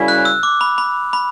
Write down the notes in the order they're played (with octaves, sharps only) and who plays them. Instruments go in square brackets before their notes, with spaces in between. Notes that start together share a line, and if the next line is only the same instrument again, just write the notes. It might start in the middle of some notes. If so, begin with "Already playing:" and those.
Already playing: [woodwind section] F#2 C#3 G3 C#4 E4
[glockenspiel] F#6
E6
D6
B5
B5
B5